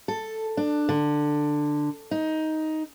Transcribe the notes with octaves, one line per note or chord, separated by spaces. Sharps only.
A4
D4
D3
D#4